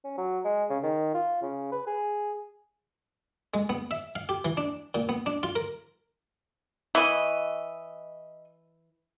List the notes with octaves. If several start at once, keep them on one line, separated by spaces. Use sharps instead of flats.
C#4
F#3
G#3
C#3
D#3
F4
C#3
B4
G#4
G#3
B3
E5
F5
G4
E3
D4
A#2
B3
D4
F4
A#4
E3 D#5 B5 C#6